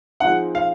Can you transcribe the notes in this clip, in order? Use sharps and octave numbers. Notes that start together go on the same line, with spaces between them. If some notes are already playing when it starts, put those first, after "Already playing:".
F3 G#3 C4 D#4 F#5
F5